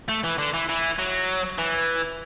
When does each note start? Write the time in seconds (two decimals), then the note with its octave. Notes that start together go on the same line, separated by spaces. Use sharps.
0.09 A3
0.24 E3
0.38 D3
0.54 E3
0.69 E3
0.99 F#3
1.59 E3